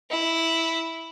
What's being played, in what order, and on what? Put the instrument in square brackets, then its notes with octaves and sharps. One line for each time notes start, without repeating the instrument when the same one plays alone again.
[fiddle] E4